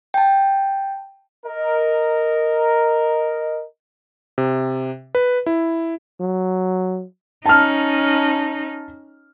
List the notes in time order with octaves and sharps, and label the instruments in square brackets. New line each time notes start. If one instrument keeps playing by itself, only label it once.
[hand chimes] G5 A5
[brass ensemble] A#4 D#5
[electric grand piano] C3
B4
E4
[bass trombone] F#3
[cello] C#4 D#4 [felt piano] A5 F6